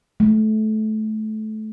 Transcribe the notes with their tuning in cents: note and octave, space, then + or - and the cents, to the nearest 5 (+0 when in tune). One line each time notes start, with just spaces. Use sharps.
A3 -25